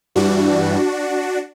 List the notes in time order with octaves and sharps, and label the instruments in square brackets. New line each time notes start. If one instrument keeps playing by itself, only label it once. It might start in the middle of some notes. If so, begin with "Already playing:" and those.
[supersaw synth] G2 E3 G3 D4 F#4